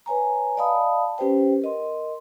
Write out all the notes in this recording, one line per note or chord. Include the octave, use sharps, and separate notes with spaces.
B4 C#5 G#5 A#5
D5 D#5 F5 A5 B5 D#6
C#4 G4 B4 C5 G5
A#4 D#5 C6